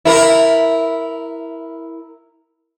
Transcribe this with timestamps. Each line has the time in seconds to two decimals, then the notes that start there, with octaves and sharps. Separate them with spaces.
0.05 E4 A#4